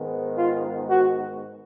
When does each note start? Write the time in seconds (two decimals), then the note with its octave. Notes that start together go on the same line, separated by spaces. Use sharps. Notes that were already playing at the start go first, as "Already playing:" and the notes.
Already playing: G#2 D#3 G#3 B3
0.37 F4
0.89 F#4